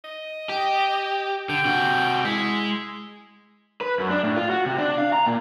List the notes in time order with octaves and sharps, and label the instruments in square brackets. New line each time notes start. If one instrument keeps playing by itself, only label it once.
[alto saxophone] D#5
[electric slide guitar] G4
[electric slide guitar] D3 [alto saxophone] G5
[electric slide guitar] C3 F#4
[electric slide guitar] G#3 [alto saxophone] E4
[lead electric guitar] B4
F#2
D4
A2
F4
F#4
C3
D4
F5
A#5
A#2